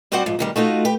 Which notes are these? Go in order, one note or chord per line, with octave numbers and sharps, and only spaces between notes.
G3 C4 F#4 C5 D5 F#5
G#2 F3
D2 D#3 G3
A3 D#4 F4 F#4
G4 B4